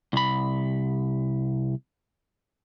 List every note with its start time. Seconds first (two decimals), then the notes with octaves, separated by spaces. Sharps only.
0.13 C2 B5